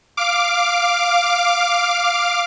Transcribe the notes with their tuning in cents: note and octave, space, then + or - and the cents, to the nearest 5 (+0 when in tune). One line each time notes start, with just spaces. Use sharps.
F5 +0 D6 +0